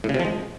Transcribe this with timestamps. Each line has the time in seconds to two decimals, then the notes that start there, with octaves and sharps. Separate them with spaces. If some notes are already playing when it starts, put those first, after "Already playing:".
0.04 A2
0.09 C#3
0.14 C3
0.20 F3
0.25 G#3